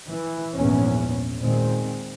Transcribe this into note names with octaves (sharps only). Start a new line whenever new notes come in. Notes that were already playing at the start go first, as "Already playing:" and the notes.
E3
A#1 E2 G#2 C#4
A#2 D#3 G#3 C4